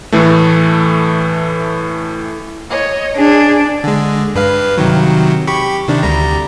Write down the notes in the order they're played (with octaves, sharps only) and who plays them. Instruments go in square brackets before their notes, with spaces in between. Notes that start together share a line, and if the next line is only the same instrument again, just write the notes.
[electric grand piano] A2 E3 A3
[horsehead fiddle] C#5 D#5
[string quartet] D4 [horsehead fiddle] G#4
[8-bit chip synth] D3 G#3
G2 B4 F5
C3 D#3 F#3
G4 B5 C#6
C3 D#3 D4
D2 G3 A#5